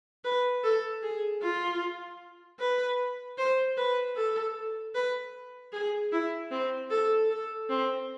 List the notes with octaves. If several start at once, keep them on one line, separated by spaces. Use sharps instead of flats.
B4
A4
G#4
F4
B4
C5
B4
A4
B4
G#4
E4
C4
A4
A4
C4